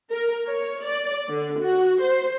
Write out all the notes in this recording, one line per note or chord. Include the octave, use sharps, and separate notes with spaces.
A#4
C#5
D5
D3
F#4
C5